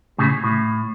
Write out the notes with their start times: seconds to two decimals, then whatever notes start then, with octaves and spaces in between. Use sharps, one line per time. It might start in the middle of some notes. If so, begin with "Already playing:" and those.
0.18 A2 C#3
0.44 A2